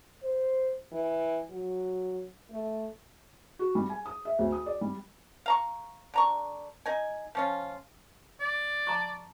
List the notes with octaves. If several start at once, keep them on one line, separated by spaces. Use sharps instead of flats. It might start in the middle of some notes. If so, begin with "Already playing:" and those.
C5
E3
F#3
A3
F#4
G3
G#5
D#6
E5
D2
D#6
D5
G3
F5 A#5 C#6
D3 A#5 C#6
D#4 G#5
F3 C#4 F4
D5
A5 A#5 C#6